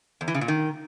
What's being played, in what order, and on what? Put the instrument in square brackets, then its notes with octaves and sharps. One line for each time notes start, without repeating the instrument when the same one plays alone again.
[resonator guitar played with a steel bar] E2
E3
C#3
A#2
D#3